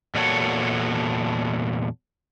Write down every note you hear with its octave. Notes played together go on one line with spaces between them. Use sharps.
E2 A#2 F#4 A4 C#5